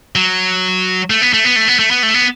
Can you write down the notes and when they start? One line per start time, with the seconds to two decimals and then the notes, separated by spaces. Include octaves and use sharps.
0.16 F#3
1.10 A3
1.22 B3
1.33 A3
1.45 B3
1.56 A3
1.68 B3
1.79 A3
1.91 B3
2.03 A3
2.14 B3